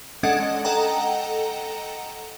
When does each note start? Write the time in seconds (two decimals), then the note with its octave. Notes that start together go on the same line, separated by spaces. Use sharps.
0.23 G#3 C#4 D4 A4 D#5 F#5
0.65 A4 D#5 F#5 G5 A#5